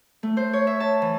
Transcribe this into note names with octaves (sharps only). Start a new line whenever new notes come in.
A3
C5
C#5
E5
A5
E3